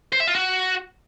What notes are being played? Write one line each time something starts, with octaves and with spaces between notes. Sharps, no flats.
C5
E5
F4
F#4